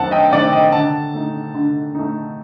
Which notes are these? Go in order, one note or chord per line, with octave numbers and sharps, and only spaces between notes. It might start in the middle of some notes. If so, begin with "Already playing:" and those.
Already playing: F#2 D#3 A3 C4 F#5 A5
D#5 G5
D#3 A3 C4 D5 F#5
D#5 G5
D3 F#5 A5
A3 D#4
D3
A3 D#4